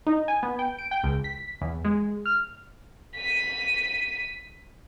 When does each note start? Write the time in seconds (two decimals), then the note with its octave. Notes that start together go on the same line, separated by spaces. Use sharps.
0.06 D#4
0.28 G#5
0.43 B3
0.59 G5
0.79 D7
0.91 G5
1.03 C#2
1.24 B6
1.61 E2
1.85 G#3
2.26 F6
3.16 B6 D#7